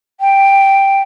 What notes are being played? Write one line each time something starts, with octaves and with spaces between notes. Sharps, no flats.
G5